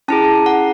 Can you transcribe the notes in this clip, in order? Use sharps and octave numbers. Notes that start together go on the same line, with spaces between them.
C#4 E4 G#4 A5
F#5